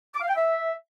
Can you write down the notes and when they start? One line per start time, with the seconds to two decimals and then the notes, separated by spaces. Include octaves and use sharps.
0.14 D6
0.21 F5
0.28 G5
0.35 E5